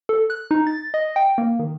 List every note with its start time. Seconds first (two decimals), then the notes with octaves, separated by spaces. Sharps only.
0.09 A4
0.30 F#6
0.51 D#4
0.67 A6
0.94 D#5
1.16 G5
1.38 A#3
1.59 D#3